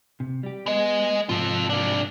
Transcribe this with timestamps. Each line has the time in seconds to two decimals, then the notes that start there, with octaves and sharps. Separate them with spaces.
0.20 C3
0.43 G3 G4
0.66 G#3 B3 D#5
1.29 G#2 C3 F3 F4 A4
1.70 A#3 D4